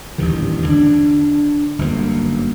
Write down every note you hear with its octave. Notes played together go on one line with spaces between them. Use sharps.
A1 E2 G2 D#3
D3 D4
G1 F#2 B2 A#3